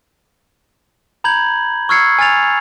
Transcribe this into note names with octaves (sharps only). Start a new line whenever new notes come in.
A#5 B5 G6 G#6 F#7
C#6 E6 F6 G#6 C7 C#7
G#5 F6 A6 F7